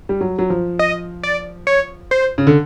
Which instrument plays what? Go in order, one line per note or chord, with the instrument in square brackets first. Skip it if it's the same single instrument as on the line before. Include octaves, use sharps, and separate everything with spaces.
[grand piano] G3
F#3
F#3
F3
[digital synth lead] D#5
D5
C#5
C5
[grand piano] C#3
D3